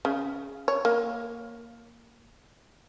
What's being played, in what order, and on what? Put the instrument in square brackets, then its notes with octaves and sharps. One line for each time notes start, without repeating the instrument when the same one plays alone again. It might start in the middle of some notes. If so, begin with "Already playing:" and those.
[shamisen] C#3
C#5
A#3